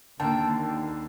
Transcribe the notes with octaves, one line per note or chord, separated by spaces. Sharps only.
D#2 D3 A#3 G5 A5